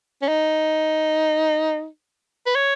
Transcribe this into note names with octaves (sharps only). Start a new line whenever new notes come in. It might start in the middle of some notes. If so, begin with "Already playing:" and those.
C#4
D#4
B4
C#5